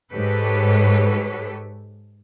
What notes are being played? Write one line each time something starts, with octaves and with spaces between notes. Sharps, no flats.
G#2 G4 A4 B4 C#5